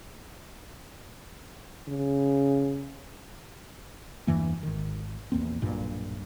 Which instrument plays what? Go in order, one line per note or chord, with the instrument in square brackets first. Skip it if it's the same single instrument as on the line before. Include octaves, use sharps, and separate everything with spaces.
[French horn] C#3
[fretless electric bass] E2 G2 E3 A#3
G#1 D#3
A#1 E2 A#3 C4
B1 G2 A#2